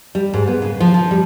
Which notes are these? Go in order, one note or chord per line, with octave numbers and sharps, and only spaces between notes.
G3
G#2
B3
C#3
F3
F3
G3